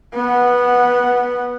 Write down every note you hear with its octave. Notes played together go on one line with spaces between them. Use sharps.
B3 F#5